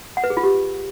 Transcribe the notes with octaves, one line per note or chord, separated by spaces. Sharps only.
F#5
B4
G#4
F4
G4